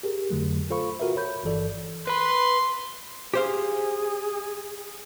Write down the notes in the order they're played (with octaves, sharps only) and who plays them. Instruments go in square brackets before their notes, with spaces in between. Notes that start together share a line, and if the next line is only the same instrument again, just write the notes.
[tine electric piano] G4 G#4 A#4
F2 D3 F#3 A3
F4 A4 C5 F5 B5 C#6
F4 F#4 A#4 B4 E5
C#5 B5 G6
G1 G2 E3 A4 D5
[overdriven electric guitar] B4 B5 [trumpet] C6
[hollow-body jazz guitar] G4 C5 F5 [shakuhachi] G#4